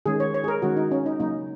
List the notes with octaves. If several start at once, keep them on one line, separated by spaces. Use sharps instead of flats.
D#3 G#3 C#4 G#4
C#5
C#5
G#4
A#4
D#3 G#3 C#4 F#4
D#4
C#4
D#4
C#3 F#3 A#3 C#4 D#4